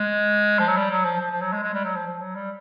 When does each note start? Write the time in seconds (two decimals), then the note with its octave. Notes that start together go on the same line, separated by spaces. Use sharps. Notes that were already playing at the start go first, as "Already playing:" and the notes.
Already playing: G#3
0.59 F3
0.68 F#3
0.77 G3
0.90 F#3
1.05 F3
1.20 F3
1.31 F3
1.41 F#3
1.53 G#3
1.63 G#3
1.74 G3
1.85 F#3
1.96 F3
2.06 F3
2.21 F#3
2.35 G3